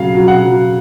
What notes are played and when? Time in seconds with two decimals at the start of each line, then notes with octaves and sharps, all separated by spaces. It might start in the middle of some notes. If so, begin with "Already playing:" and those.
Already playing: C#3 F#3 F5
0.15 F#3
0.28 F#5
0.42 F#3